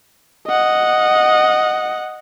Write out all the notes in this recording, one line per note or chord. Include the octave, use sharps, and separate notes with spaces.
D#5 F#5